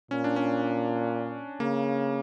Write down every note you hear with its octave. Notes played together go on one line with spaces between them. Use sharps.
A#2 C#4
D4
C#4
C#3 A#3